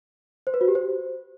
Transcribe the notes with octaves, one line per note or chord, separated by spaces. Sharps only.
C5
B4
F#4
G4
C5